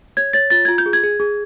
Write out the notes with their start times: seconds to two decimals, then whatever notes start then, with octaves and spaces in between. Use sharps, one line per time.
0.17 C#5 G#6
0.33 C#5 A6
0.50 F4 A6
0.65 F4 G#6
0.78 G6
0.86 G#4
0.93 G#6
1.03 G#4
1.20 G#4